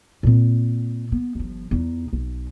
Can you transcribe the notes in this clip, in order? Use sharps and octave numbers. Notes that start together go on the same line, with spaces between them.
A#2 C4
B3
G1 F3
E2 D#4
B1